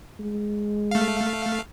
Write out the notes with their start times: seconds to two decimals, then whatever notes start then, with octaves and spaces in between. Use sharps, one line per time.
0.20 G#3
0.91 A3 F5